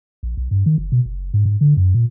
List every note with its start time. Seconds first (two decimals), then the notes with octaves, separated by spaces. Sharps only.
0.23 A#1
0.37 B1
0.51 G2
0.66 D#3
0.78 F#1
0.92 B2
1.05 F#1
1.34 G#2
1.45 G#2
1.61 D3
1.77 F#2
1.94 A#2